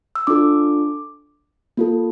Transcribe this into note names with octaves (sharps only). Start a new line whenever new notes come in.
E6
D4 F4 A4 D6
A#3 F4 A4